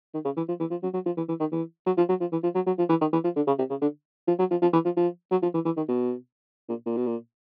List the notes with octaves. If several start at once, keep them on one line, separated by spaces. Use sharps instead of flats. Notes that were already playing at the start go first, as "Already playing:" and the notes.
D#3
C#3
E3
F3
E3
F3
F#3
F#3
F3
E3
E3
D#3
E3
F#3
F3
F#3
F3
E3
F3
F#3
F#3
F3
E3
D#3
E3
F3
D3
C#3
C3
C#3
D3
F3
F#3
F3
F3
E3
F3
F3
F#3
F3
E3
E3
D#3
B2
A#2
A#2
B2
A#2